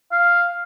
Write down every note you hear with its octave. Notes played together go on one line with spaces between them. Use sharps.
F5